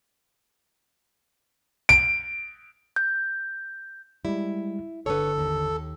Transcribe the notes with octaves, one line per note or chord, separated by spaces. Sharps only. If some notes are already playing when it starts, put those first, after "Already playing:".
D7
G6
G3 G#3 E4
G1 D3 A4 B4 C#5
D#2